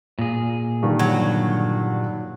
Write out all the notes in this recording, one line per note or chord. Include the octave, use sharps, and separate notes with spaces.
A#2 G#4
G2 D3 D#3
F#3